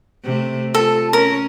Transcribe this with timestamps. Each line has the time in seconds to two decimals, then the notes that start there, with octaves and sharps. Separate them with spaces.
0.24 C3 A3
0.74 F4 A4
1.13 C#4 A#4